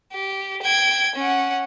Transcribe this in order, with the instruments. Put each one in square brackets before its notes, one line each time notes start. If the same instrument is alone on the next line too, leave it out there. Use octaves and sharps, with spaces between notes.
[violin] G4
G5 G#6
C#4 F#5